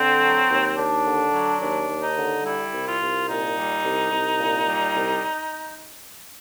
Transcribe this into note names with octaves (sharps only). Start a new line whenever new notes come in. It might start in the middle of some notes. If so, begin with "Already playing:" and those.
Already playing: D3 C4
F#3
D#2
D#2 D4
D3
F#3
D#2 D4
D#2
D#4
D3
G3 E4
C2
F4
C2
A#2 D#4
G3
C2
C2
A#2
G3
C2